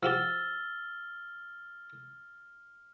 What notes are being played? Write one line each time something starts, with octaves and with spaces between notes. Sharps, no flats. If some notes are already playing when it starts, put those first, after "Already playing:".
F3 F#4 G4 E6 F6 A6 G7